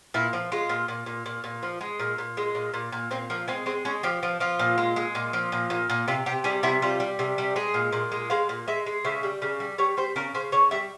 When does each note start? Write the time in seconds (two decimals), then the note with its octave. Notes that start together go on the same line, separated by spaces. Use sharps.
0.14 A#2 E4
0.33 F3
0.52 G#3 F4
0.69 A#2
0.88 A#2
1.06 A#2
1.26 A#2
1.44 A#2
1.63 F3
1.81 G#3
1.99 A#2
2.18 A#2
2.37 G#3
2.55 A#2
2.74 A#2
2.92 A#2
3.11 A#2 C4
3.30 F3 A#3
3.48 G#3 C4
3.66 G#3 C4
3.85 G#3 C#4
4.03 F3 G4
4.23 F3
4.40 F3 F4
4.59 A#2
4.78 G#3
4.96 G#3
5.15 A#2
5.33 F3
5.52 A#2
5.70 A#2
5.90 A#2
6.08 C3 F4
6.26 C3 G4
6.44 G3 G#4
6.63 C3 E4
6.82 G3 F4
7.00 G3
7.19 C3
7.38 G3
7.56 G#3 G#4
7.74 A#2
7.93 A#2
8.12 G#3
8.30 G#3 F5
8.49 A#2
8.68 G#3 E5
8.86 G#3
9.05 C#3 E5
9.23 G3
9.42 C#3
9.60 G3
9.78 G3 C#5
9.97 G3 C5
10.16 C#3 A#4
10.34 C#3 C5
10.52 C#3 C#5
10.71 G3 E5